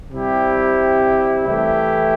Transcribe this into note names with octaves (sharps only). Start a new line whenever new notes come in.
C3 G3 E4 G4
E3 A3 E4 G4